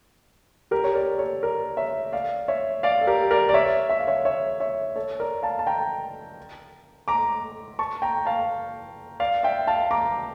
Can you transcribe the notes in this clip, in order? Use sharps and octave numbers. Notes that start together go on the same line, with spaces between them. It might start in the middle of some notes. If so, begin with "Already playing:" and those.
G4 A#4
C#5
A#4 D5
A4 C#5
A#4 D5
C#5 E5
D5 F5
C#5 E5
D5 F5
A4
G4 A#4
A#4 D5
D5
C#5 E5
E5
F5
C#5 E5
C#5 E5
C#5 E5
A4 C#5
A#4 D5
F5 A5
A5
G5 A#5
A#5 D6
A5 C#6
G5 A#5
F5 A5
D5 F5
E5 G5
F5 A5
A#5 D6